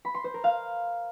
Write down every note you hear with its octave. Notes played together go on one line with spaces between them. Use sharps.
B5
C6
C5
A#4
F5